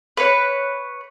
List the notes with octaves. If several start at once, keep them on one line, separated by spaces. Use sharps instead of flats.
B4 C#5